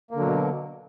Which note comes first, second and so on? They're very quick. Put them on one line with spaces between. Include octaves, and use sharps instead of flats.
A#3 D3 F#3 B2